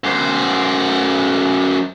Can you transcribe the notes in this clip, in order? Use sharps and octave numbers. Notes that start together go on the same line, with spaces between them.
F#2 C5